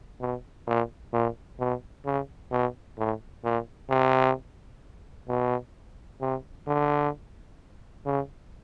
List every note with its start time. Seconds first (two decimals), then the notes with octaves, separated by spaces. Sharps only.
0.20 B2
0.67 A#2
1.13 A#2
1.59 B2
2.05 C#3
2.52 B2
2.98 A2
3.44 A#2
3.90 C3
5.28 B2
6.21 C3
6.67 D3
8.06 C#3